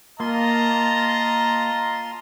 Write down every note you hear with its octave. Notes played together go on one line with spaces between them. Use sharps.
A#3 F4 D#5 A5 A#5 C6